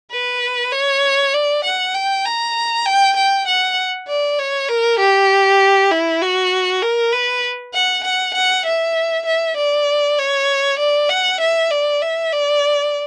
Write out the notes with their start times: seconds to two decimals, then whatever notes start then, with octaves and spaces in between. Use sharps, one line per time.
0.11 B4
0.72 C#5
1.34 D5
1.65 F#5
1.94 G5
2.25 A#5
2.86 G5
3.17 G5
3.48 F#5
4.08 D5
4.39 C#5
4.69 A#4
4.99 G4
5.91 E4
6.22 F#4
6.82 A#4
7.13 B4
7.74 F#5
8.04 F#5
8.35 F#5
8.66 E5
9.26 E5
9.57 D5
10.18 C#5
10.79 D5
11.09 F#5
11.41 E5
11.71 D5
12.02 E5
12.32 D5